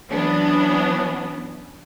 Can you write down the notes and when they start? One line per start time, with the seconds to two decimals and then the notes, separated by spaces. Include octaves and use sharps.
0.11 E3 F#3 B3 C#4 D4